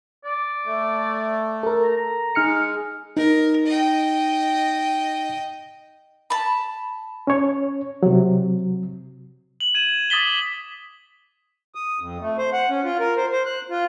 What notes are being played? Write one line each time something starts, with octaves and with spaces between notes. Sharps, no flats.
D5
A3
A4 A#4
A#5
G#3 D#4 F6 C#7
D#4 A#4
D#5 G5
A5 B5
C#4 C#5
C3 F#3
F#7
G#6 D#7 E7
D6 D#6 A6 B6 G7
D#6
F2
A3
C5
F#5
C#4
F4
A#4
C5
C5
F#6
F4